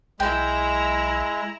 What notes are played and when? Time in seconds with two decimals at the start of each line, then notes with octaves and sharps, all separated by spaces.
0.20 B1 G#3 E4 G5 A#5